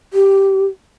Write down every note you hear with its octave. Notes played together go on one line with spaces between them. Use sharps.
G4